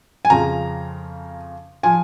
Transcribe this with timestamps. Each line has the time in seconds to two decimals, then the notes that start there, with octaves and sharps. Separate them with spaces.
0.25 G#5
0.30 F2 C#3 F3 A#5
1.83 F3 G#5